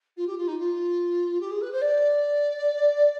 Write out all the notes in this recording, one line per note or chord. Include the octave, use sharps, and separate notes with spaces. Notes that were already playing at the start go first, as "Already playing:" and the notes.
F4
G4
F4
D#4
F4
G4
G#4
B4
C5
D5